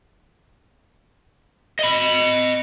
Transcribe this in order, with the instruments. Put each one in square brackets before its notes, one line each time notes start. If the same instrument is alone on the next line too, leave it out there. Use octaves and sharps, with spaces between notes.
[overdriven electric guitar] D#5 B5